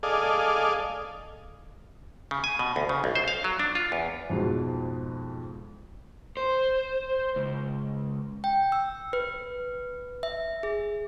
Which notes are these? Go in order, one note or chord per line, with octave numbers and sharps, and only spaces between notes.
G#4 A4 D5 D#5 F5
C#3
G#5
B2
D2
C#3
B1
C5
F5
F#3
D4
F4
E2
F2 G#2 B2
C5
C#2
G5
E6
B4
E5
G#4